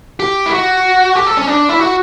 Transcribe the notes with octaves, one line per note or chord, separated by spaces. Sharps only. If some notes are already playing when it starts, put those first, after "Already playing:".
G4
E4
F#4
G4
A4
C#4
D4
E4
F#4